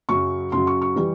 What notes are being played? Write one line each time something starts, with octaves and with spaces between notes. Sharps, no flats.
F#2 C#3 F#3 C#6
F#2 C#3 F#3 C6
C#6
C#6
E3 G3